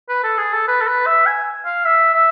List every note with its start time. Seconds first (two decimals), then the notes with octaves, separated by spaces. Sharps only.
0.09 B4
0.24 A4
0.38 G#4
0.53 A4
0.68 B4
0.81 A4
0.87 B4
1.06 E5
1.26 G#5
1.65 F5
1.85 E5
2.14 E5